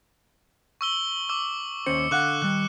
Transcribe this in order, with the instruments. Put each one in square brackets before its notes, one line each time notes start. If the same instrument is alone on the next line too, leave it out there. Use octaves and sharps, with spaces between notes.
[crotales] C#6 E6 G7
D6 E6
[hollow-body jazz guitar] D#2 C#4 C5 [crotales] C#7
[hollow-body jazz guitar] D3 F5 F#5 [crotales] D6 F#6
[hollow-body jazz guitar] D#3 G3 [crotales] F#6